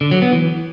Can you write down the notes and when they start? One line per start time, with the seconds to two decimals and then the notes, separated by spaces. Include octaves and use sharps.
0.01 D3
0.11 F#3
0.22 B3
0.32 E3